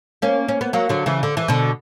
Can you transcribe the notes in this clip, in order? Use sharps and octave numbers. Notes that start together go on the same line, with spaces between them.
A#3 C#4
C#4
B3
F#3 A#3
D3 F#3
C#3 E3
D3
E3
B2 D3